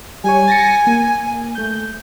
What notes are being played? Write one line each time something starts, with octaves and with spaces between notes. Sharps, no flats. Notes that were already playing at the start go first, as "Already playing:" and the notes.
G3 G4 C#5 G#5
A6 A#6 C#7
A#3
A3 G6